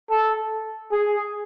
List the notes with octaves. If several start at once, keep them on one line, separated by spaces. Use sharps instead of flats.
A4
G#4